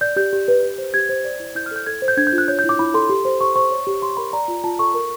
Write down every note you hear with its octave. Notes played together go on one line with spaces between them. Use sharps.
D5 G6
G4 G6
G4
B4
G4
C5
G4 G#6
C5
D5
E4
E4 G6
F6
A4 G6
A4 G#6
C5
G6
D4 G#6
G6
F4
F#6
C#5 G6
G6
E4
D6
E4 B5
A4 C6
G4
C5
G4 C#6
C5 C#6
C#5
G4
G4 C6
A#4 B5
D5 A#5
F4
F4 A5
A4 C#6
A#4